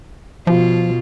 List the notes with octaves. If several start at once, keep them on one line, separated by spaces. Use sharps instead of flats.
B2 F3 F4